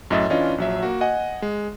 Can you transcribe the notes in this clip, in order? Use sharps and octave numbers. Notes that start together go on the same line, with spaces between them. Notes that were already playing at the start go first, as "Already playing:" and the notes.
F#2 A2 D#5 E5 E6 A6
E3 C#4 D4 F4 D#5
A#1 F#3 E5
A#3 F#4
D#5 F#5 G#5
G#3